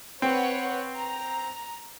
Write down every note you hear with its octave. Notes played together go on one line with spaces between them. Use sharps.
C4 B4 C#5 F#5
A#5